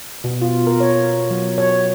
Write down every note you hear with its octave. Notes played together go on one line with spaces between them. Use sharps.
B2
F4
A#4
C#5
F#3
C#5